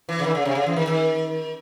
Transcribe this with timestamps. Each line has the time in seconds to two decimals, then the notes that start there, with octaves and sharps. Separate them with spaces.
0.09 E3
0.19 C#3
0.24 D#3
0.35 C#3
0.45 C3
0.55 C#3
0.66 E3
0.76 D#3
0.87 D#3